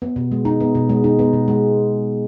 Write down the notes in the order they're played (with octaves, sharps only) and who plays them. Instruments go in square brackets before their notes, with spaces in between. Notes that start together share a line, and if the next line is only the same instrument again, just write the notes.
[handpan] B3
B2
G#3
D#4
B3
B2
G#3
D#4
B3
B2
G#3